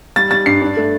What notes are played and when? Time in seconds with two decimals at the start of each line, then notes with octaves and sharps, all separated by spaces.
0.16 G3 A6
0.31 G3 A6
0.46 G2 C7
0.61 D4
0.77 A3